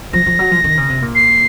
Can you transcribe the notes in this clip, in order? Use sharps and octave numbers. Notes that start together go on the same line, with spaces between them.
F3 A#6
F3
F#3
F3
D#3
C#3
C3
A#2
C7